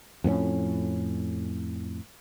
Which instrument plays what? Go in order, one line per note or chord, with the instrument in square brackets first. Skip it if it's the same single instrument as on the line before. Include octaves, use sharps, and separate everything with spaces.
[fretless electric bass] F2 A2 A#3 C#4